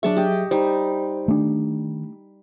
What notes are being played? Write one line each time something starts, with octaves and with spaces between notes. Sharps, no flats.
F#3 D4 G#4 E5 A5 C#6
G4 D#5
G3 D#4 C5
D#3 A3 D4